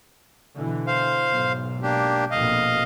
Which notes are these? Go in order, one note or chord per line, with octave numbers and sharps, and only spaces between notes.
B2 D3 E3
C5 F5
B1 G#2
A#3 D4 G4
A#1 F2 B2 D#5 F5